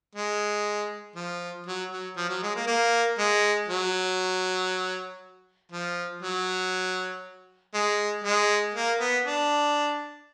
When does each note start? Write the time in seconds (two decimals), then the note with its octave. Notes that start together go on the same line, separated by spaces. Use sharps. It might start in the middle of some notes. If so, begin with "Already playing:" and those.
0.15 G#3
1.15 F3
1.67 F#3
1.92 F#3
2.17 F3
2.29 F#3
2.43 G#3
2.56 A#3
2.67 A#3
3.19 G#3
3.68 F#3
5.72 F3
6.22 F#3
7.74 G#3
8.24 G#3
8.74 A#3
9.01 B3
9.25 D4